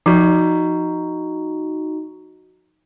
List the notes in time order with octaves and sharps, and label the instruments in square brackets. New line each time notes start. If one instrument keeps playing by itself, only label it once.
[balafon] F3 [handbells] D#4 F#4